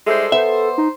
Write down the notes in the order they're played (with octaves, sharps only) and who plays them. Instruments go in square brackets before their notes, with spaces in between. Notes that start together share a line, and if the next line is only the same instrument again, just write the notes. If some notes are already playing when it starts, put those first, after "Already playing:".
[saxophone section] G3 G#3 C5 [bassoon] E4 [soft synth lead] A4
[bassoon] B3 [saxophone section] C5 [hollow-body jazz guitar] E5
[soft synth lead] D#4